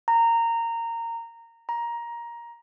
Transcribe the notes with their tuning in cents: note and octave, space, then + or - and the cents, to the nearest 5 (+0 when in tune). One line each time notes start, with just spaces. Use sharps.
A#5 -15
A#5 +15